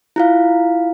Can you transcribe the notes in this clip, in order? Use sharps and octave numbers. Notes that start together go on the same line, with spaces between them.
E4 F4 F5